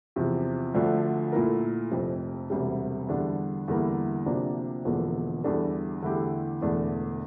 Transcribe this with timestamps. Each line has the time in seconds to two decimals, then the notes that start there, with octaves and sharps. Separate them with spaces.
0.16 E2 C3 F3
0.74 D2 D3 F3 A3 D4
1.32 A#2 A3 E4 A#4
1.91 F1 F2 C3
2.50 E1 D2 C3 G3
3.08 E2 D3 G3 D4
3.68 E2 D3 G3 A#3 E4
4.26 D2 C3 F3 A#3 D4
4.85 E1 E2 D3 F3 A#3
5.44 E2 D3 G3 D4 A4
6.02 E2 D3 A3 E4 G4
6.61 E1 E2 D3 A3 D4